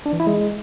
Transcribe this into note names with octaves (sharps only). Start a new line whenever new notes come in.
D4
E3
E4
G#3